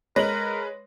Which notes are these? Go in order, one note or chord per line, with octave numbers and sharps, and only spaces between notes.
G#3 A#4 B4 C#5 A#6 F#7